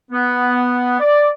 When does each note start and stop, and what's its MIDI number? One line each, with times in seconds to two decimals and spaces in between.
0.11 0.99 59
1.00 1.29 74